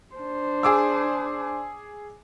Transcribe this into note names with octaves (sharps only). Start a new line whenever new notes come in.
D4 C5
G#4 D6 E6